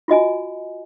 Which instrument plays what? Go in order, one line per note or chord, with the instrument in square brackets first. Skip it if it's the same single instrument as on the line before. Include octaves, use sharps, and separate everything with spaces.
[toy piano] F4 F#4 D#5 G#5